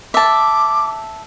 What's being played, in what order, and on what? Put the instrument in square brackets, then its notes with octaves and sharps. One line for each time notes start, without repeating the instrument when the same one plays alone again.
[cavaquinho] E5 A5 [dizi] D6